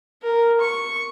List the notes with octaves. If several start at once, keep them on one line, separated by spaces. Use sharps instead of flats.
A#4
C#6